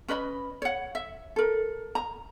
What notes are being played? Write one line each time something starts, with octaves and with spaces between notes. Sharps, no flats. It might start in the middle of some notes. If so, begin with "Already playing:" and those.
C#4 B4 D#5 B5
C#5 F#5
E5
A4 A#4
A#5